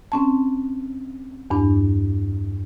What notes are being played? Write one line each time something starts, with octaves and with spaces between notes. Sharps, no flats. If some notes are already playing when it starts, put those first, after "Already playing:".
C4 C#4 A5
E2 G2 D4